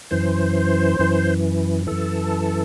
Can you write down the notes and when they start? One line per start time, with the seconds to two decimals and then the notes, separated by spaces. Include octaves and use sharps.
0.11 F#2 E3 C5
0.99 F#2 E3
1.87 F#2 E3 A4